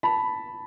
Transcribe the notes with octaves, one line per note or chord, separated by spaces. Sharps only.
A5 B5